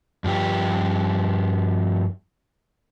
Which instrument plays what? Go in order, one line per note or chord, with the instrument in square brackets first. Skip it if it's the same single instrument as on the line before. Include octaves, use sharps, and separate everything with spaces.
[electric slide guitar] G2 F3 G4